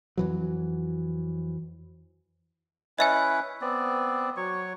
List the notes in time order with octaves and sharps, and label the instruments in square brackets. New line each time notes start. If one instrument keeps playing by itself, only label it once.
[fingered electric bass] F2 E3 F#3
[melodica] C#4 E4 B4 [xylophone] D#5 E5 G#5
[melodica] B3 C4 D5
F#3 C#5 C#6